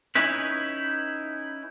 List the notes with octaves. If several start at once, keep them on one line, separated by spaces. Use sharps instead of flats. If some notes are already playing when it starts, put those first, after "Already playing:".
C#4 D#4 E4 B4